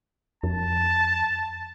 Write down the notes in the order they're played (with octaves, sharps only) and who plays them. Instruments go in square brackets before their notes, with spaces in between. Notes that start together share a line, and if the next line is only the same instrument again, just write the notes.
[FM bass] F2 [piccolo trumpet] A5